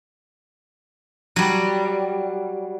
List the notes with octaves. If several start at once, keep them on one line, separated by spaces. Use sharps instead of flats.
F#3 G3